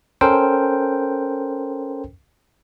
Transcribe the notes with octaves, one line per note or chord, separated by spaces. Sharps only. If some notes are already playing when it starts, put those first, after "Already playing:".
C#4 A4 A#4 C5 G5